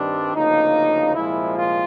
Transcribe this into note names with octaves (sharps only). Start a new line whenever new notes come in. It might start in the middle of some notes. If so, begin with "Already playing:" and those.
Already playing: G2 D#3 G3 C4 D4
D2 C#3 F3 A#3 D#4
C2 A#2 F3 G#3 E4
F4